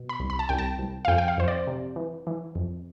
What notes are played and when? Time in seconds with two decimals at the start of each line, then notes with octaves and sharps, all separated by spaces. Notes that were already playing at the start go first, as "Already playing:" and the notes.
Already playing: B2
0.09 B5
0.20 C2
0.30 B5
0.39 A5
0.49 C2 G5
0.58 A5
0.79 C2
1.05 F5
1.08 F2 G5
1.18 G5
1.28 F5
1.38 F2 C5
1.48 D5
1.67 C3
1.96 E3
2.27 E3
2.55 F2